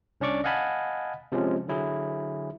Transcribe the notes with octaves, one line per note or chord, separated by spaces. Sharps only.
C2 C#4 D4 D5 C#6 D6
D#5 F5 F#5 G#5 A5 B5
C3 F3 G#3 C#4
D3 F#3 E4 G#4